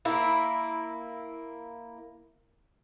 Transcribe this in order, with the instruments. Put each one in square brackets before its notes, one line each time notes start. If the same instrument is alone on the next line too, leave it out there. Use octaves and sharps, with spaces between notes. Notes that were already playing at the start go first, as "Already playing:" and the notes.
[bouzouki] A#3 E4